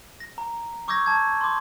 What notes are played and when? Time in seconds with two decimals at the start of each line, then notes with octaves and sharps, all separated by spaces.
0.20 A#6
0.38 A#5
0.88 C#6 D6 E6 G6 G#6 A#6
1.06 A5 G#6
1.41 C6 D6